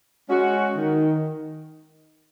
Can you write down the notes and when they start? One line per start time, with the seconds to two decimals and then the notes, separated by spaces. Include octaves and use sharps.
0.29 G#3 C#4 F#4
0.77 D#3